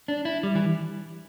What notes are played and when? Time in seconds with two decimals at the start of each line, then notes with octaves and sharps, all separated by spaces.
0.08 D4
0.25 E4
0.43 G3
0.55 E3